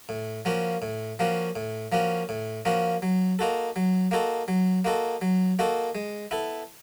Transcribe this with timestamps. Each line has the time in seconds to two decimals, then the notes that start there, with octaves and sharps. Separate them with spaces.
0.09 A2
0.45 F3 A#3 C#4 F#4
0.82 A2
1.19 F3 A#3 C#4 F#4
1.56 A2
1.92 F3 A#3 C#4 F#4
2.29 A2
2.65 F3 A#3 C#4 F#4
3.02 F#3
3.39 A#3 D#4 F#4 A4
3.76 F#3
4.11 A#3 D#4 F#4 A4
4.48 F#3
4.85 A#3 D#4 F#4 A4
5.21 F#3
5.59 A#3 D#4 F#4 A4
5.95 G#3
6.31 B3 E4 A4